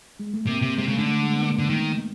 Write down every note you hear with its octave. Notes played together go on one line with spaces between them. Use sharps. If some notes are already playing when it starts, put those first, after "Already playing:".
G#3
A3
C3 A#3
C3
C3 G#3
C#3
A3
D3
A3
G#3
B3
A#3
D3
D#3